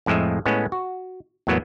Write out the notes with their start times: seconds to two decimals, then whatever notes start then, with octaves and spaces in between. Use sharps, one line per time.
0.06 F2 A2 F3 G#3 E5
0.45 A2 G#3 B3 C#4
0.72 F#4
1.47 E2 A2 F#3 A#3 B3